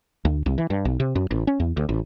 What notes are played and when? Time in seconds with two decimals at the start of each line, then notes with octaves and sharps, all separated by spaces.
0.25 D2
0.46 C2
0.58 E3
0.70 G2
0.85 B1
1.00 C3
1.15 F#2
1.31 A1
1.47 C#4
1.60 E2
1.77 D2
1.89 A1